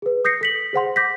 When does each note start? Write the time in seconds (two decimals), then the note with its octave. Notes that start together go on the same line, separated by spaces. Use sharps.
0.02 G#4 B4
0.25 D#6 G6 A#6 C7 C#7
0.41 A4 B6 F#7
0.73 G#4 C5 F#5 C6
0.96 D6 G6 A#6 B6